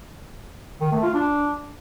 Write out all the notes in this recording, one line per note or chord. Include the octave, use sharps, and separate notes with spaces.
D#3
A3
F4
D4